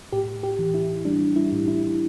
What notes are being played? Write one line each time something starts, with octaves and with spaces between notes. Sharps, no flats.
A2 G4
G4
E3
E4
G3 D4
E4
A2
E4